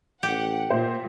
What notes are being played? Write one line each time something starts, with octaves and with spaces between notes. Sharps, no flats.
A1 G4 F#5
A#2 A#3 C5